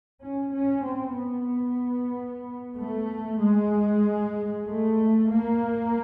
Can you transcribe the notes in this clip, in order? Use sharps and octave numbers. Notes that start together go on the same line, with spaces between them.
C#4
C#4
C4
B3
A3
G#3
A3
A#3